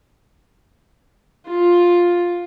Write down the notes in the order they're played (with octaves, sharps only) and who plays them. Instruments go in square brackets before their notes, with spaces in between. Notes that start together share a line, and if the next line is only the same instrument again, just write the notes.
[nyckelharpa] F4